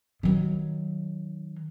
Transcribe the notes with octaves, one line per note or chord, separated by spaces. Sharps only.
D#3 F#3